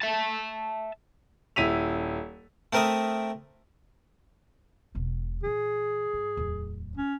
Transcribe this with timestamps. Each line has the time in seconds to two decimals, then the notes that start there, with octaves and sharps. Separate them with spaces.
0.02 E5 A5
1.56 D#1 E4 B6 D#7 F7
2.73 A3 C4 A#4 E5 D#6
4.95 E1 B2
5.44 A#2 E3 G#4
6.13 G#2
6.37 D1 E2
6.97 C#4